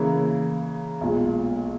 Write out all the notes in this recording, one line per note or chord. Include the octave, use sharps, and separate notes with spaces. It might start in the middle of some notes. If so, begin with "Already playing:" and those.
Already playing: C#3 E3 A#3 E4
B1 A#2 G#3